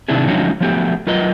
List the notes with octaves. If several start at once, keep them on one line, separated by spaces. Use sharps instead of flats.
C3 D#3 C4 D4 E4 G#4
D3 F3 F#3 G#3 C#4 D#4
F3 F#3 A3 B3 G4
F#3 F4 A#4 B4 D#5